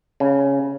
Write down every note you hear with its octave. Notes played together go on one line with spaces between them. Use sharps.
C#3